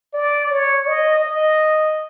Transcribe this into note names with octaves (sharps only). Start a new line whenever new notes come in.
D5
C#5
D#5
D#5